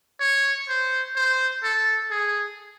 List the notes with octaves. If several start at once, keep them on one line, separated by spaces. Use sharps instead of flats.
C#5
C5
C5
A4
G#4